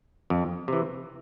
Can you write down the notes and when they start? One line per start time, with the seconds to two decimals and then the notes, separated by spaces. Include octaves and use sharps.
0.30 F2
0.68 C3 E3